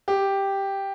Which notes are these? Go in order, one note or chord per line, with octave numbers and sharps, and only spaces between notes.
G4